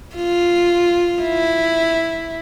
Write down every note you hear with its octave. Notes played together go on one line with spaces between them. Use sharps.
F4
E4